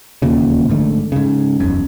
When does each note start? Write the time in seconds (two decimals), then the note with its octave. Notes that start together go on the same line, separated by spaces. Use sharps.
0.22 E1 D#2 A#2 C#3
0.69 A#1 G#2 D3 A3
1.12 G#2 C#3
1.60 E1 B1 F#2